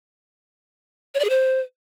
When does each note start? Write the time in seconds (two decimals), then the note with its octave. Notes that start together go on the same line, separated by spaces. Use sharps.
1.14 C#5
1.19 D5
1.25 G#4
1.30 C5